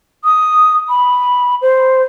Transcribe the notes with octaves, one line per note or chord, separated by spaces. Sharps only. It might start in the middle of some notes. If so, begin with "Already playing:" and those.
D#6
B5
C5